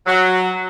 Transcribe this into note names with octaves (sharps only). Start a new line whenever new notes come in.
F#3